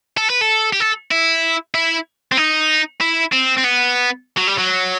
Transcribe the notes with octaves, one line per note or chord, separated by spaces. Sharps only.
A4
B4
A4
G4
A4
E4
E4
C4
D#4
E4
C4
C4
B3
F#3
G3
F#3